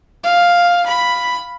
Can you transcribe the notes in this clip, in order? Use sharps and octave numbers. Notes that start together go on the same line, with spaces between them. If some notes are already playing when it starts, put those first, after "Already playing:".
F5
B5